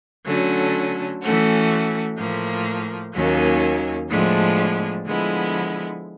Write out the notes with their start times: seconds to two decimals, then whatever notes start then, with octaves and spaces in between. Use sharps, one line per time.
0.26 D3 F#3 A3 C#4
1.22 E3 A3 C#4 F#4
2.17 A2 F3 A#3
3.13 D#2 D#3 F#3 A#3 C#4
4.09 A2 F3 G#3 B3 D4
5.05 D3 F3 G#3 B3 E4